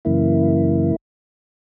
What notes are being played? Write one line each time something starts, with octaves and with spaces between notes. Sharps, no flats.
F#2 C#3 E3 A#3 E4